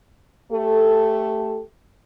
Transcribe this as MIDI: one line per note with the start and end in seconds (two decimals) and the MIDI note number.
0.52 1.61 57
0.52 1.61 67
0.52 1.61 69